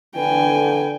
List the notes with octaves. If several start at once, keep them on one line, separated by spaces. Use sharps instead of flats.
D3 B4 G5 G#5